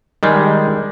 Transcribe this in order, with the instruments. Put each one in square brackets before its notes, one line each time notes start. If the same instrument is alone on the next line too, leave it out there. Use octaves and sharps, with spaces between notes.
[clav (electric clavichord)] D#3 G3 G#3